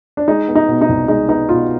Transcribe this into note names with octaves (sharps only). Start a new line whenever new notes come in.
D4
G#3 D#4
B3
D#4
B2
D#4
C2
G#3 D#4
B3 D#4
B2 F4